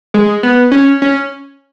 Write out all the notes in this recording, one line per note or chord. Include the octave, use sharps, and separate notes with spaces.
G#3
B3
C#4
C#4